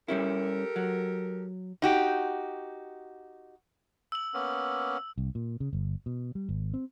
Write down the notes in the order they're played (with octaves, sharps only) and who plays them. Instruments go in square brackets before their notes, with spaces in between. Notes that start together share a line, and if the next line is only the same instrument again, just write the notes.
[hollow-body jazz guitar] G3 C#4 E4 [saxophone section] G4 A4 A#4
[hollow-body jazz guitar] F#3
[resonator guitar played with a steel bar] D#4 F#4 G4
[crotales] E6 F#7
[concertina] A#3 B3 C#4
[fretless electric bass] C2
A#2
C#3
G1
B2
G3
G#1
C4